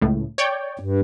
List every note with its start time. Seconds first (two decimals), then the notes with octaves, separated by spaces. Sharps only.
0.01 C#2 A2
0.38 C#5 D5 G5
0.80 G2